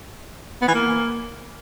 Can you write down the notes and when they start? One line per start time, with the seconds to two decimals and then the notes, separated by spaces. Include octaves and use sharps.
0.62 B3
0.68 E3
0.74 A#3